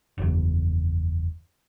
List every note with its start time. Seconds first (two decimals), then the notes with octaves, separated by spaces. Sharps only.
0.18 F#1 E2